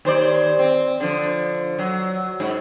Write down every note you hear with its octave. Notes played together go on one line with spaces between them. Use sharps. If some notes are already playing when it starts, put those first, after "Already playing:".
D#2 C5 D5
C4
D3 F3
F#3
G#2